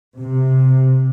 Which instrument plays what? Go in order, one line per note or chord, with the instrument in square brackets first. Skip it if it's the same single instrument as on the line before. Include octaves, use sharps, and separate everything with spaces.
[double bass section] C3